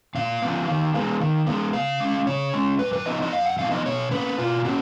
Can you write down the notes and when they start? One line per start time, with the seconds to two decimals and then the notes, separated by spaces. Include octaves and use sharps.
0.15 A#2 F5
0.42 F3 B3
0.68 D#3
0.94 G#3 B3
1.20 D#3
1.47 G#3 B3
1.73 C#3 F5
2.00 G#3 C#4
2.26 C#3 C#5
2.54 G#3 C#4
2.79 F#2 B4
2.93 B4
3.06 F3 B3 D#4 D#5
3.22 D#5
3.32 F#2 F5
3.46 F#5
3.59 F3 B3 D#4 F5
3.72 D#5
3.85 B2 C#5
4.11 A#3 C#4 B4
4.38 B2 F4
4.65 A#3 C#4 F#4